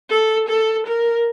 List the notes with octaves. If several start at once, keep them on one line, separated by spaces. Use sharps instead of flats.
A4
A4
A#4